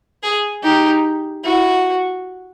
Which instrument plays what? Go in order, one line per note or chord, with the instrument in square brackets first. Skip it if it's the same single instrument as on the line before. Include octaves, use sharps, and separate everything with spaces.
[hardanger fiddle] G#4
[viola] D#4 [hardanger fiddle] G4
[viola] E4 [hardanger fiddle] F#4